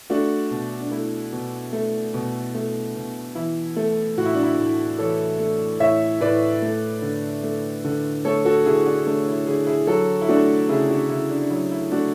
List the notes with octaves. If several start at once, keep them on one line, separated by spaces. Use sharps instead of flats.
A3 D4 F#4
B2
D4
A3 E4
B2
A3
B2
A3
B2
E3 E4
A3
A2 F#4
E4
D4
E4
A2
E3 A4 C#5
A3
A2 C#5 E5
A2 B4 D5
A3
D3
A3
D3
A3 A4 C#5
F#4 A4
D3 E4 G#4
D4 F#4
A3 D4
E4
D3 E4 G#4
E4 G#4
F#3 F#4 A4
E4
A3 D4 F#4
C#3 E4 G#4
D4 F#4
C#3 E4
D4
D4
F#3 E4
E4
A3 D4 F#4